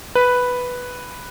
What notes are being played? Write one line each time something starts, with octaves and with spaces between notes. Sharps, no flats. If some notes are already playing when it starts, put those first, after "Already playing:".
B4